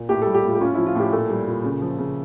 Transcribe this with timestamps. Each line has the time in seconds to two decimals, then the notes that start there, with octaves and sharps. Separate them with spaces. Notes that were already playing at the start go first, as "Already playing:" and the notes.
Already playing: A#2
0.09 A2 G4
0.21 G3 A4
0.34 G4
0.44 A2 F4
0.54 G4
0.61 C#4 F4
0.74 F3 E4
0.86 F4
0.95 A2 G4
1.12 A#2 A4
1.30 G3
1.47 A#2
1.64 C#3
1.82 F3
1.98 C#3